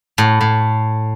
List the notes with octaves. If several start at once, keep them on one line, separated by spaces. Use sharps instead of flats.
A2
A2